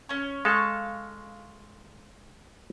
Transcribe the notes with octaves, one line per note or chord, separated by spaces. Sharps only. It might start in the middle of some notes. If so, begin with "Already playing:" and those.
C#4 C#5
G#3 A4 F5 C#6